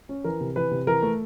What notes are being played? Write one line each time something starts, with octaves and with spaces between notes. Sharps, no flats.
C#4
E3 A#4
C3
E3 B4
C3
E3 A#4
A3